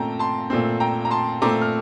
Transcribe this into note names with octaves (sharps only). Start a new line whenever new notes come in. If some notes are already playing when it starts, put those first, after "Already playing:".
Already playing: A#2 A3 C4 G5 A5 A#5
A5 C6
A#2 A3 C4
G5 A#5
A#5
A5 C6
A#2 A3 C4 A#5 D6
F6